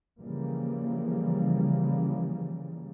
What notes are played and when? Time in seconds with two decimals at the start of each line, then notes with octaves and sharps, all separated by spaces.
0.20 C#3 E3 F3 G3 A#3